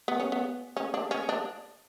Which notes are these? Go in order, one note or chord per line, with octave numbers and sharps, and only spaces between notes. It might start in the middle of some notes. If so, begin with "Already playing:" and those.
B3
C#4
B3
C#4
D4
C#4
D4